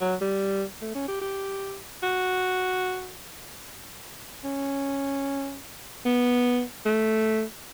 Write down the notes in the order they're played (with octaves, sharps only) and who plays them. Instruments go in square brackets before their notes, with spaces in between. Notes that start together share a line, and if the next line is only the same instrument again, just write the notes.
[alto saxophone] F#3
G3
A3
C#4
G4
G4
F#4
C#4
B3
A3